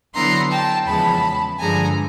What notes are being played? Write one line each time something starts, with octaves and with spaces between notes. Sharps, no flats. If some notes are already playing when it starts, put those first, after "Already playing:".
D3 F#3 B3 E4 A#5 C6
G5 A5
E2 C#3 F3 G#3 A5 B5
G2 D3 F3 G#3 G#5 A#5